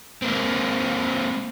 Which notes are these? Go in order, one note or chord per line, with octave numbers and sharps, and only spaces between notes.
G#3 A#3 C4